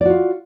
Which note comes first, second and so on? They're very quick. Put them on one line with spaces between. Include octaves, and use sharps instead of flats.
D5 F#4 F4